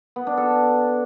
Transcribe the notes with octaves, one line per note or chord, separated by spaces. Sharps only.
B3
D4
A4